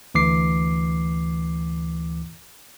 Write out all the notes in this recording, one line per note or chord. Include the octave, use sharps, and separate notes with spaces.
D2 E3 D6 C7